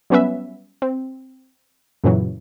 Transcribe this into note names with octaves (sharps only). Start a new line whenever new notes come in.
F#3 G3 B3 C#4 B4 E5
C4
F#2 A#2 C#3 E3 F#3